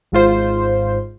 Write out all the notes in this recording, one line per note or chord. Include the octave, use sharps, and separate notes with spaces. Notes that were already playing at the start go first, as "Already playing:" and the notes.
G#1 G#2 F4 C5